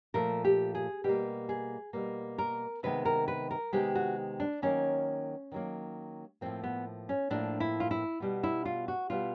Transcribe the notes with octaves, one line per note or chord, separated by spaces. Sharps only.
A#2 F3 A3 A#4
G4
G#4
B2 G3 A#3 G4
G#4
B2 G3 A#3
A#4
C3 D#3 G#3 B3 B4
A#4
B4
A#4
C3 D#3 G#3 B3 G4
F#4
D4
D#3 F#3 A#3 C#4
D#3 F#3 A#3
A2 F3 A#3 C4
B3
C#4
A2 F3 A#3 D4
E4
F4
E4
B2 G3 B3
E4
F4
F#4
B2 G3 B3 F4